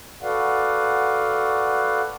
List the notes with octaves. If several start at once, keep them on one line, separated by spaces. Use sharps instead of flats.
F#4 A4 B4 D5 F5 F#5